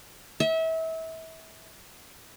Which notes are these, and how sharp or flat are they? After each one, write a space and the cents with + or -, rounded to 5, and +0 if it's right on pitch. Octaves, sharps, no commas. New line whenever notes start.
E5 -30